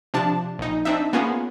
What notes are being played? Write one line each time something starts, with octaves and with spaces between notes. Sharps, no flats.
C3 F3 D4 A5
A#1 D#4
C4 D4 D#4 E5
A#3 B3 C#4 F4 G#4